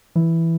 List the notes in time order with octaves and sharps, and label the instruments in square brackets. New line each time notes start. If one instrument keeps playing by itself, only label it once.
[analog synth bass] E3